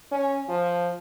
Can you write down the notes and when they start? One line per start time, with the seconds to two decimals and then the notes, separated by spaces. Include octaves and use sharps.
0.12 C#4
0.49 F3